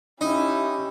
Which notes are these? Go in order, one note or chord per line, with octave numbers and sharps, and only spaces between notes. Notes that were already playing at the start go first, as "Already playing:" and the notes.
C#4 D#4 E4 G4